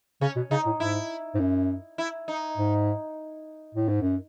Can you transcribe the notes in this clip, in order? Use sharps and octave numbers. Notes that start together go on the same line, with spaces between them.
C#3 C#4
B2
C#3 D#4
A2
G#2 E4
G#2
F#2
E4
D#4
G#2
A2
G#2
F#2